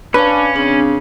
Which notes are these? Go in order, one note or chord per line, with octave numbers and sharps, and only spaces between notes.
C#4 D4 B4 F5 D6
C#3 C4 D4